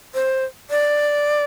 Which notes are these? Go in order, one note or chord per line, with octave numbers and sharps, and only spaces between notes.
C5
D5